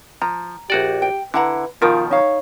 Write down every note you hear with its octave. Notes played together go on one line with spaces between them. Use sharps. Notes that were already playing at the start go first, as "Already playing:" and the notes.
F3 A#5
A#1 F#4 G4 D5
G5
D3 E4 B4 F#5 A#5
B2 D#3 F3 F4 A#4
D#4 C#5 F5